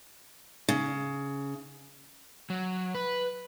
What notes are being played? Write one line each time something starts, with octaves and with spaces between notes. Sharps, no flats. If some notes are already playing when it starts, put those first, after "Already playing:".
C#3
F#3
B4